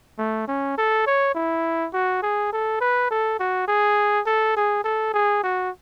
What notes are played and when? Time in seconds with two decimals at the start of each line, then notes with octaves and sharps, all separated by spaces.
0.18 A3
0.48 C#4
0.78 A4
1.07 C#5
1.35 E4
1.93 F#4
2.22 G#4
2.52 A4
2.81 B4
3.11 A4
3.39 F#4
3.68 G#4
4.26 A4
4.56 G#4
4.84 A4
5.14 G#4
5.44 F#4